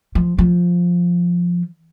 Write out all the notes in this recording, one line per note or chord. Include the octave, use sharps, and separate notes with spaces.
F3
F3